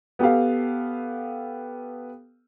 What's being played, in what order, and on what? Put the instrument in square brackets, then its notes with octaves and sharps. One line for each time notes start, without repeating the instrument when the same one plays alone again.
[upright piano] B3 G4 A4 F5